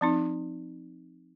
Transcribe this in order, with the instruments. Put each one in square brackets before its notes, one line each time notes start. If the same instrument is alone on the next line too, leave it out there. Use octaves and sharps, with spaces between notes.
[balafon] F3 C4 D#4